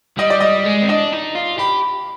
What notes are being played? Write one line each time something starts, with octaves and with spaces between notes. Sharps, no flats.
G3 D#5
D5
G3 D#5
G#3
C4
D4 D#5
D#4
F4
G4 B5